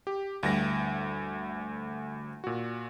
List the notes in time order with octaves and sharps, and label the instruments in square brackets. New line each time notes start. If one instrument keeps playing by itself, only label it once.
[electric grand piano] G4
[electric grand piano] D2 A#6 [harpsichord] G2 E3 G3
[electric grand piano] A#2 F#4